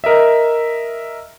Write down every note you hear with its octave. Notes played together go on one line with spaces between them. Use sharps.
A#4 D#5 E5